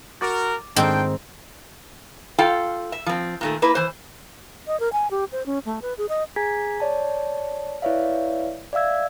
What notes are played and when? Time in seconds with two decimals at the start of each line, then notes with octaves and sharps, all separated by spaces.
0.21 F#4 A#4 D6 A6
0.76 G#2 D#3 C4 D4 C5 G5
2.38 F4 A4 F5 G5
2.92 E5
3.06 F3 C4
3.41 A#2 D#3 A3
3.62 A#3 E4 B4
3.75 E3 C5
4.67 D#5
4.80 A#4
4.93 G#5
5.11 G4
5.32 C5
5.46 C#4
5.66 A3
5.82 B4
5.98 G#4
6.09 D#5
6.36 G#4 G#5 A#5 G#6 B6
6.80 C#5 D5 A5
7.82 E4 B4 C#5 D5 E5 F5
8.73 D5 E5 F5 E6 G#6